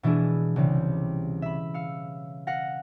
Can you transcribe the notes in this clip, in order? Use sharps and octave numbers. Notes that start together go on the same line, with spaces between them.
B2 E3 G#3 D4 E4 G#4
C2 C#3 E3 G3
E5 B5
F5 E6 C#7
F5 F#5 A#6